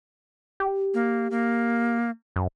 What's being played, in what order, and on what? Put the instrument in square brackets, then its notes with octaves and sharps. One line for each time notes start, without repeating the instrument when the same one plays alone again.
[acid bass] G4
[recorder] A#3
A#3
[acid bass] F#2